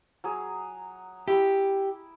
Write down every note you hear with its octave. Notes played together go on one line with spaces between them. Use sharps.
F#3 G#4
E4 G4 D6